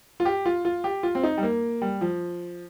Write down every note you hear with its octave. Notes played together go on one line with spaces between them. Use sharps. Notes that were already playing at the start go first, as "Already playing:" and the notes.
F4
G4
F4
F4
G4
F4
C4
D#4
G3
A#3
G3
F3